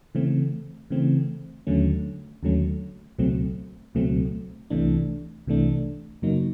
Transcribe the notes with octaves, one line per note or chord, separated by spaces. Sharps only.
C#3 E3 A3 C4
C#3 E3 A3 C4
D#2 D3 F#3 A3 C#4
D#2 D3 F#3 A3 C#4
C#2 B2 F#3 A3 C4
C#2 B2 F#3 A3 C4
C2 C3 E3 A3 D4
C2 C3 E3 A3 D4
F#2 C#3 F#3 A#3 D#4